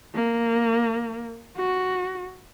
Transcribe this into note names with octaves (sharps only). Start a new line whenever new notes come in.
A#3
F#4